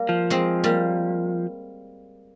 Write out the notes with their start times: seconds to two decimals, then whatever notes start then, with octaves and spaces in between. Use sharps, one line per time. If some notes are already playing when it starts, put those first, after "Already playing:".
Already playing: G3 A#3
0.09 F3
0.30 G#3 C4
0.64 G3 A#3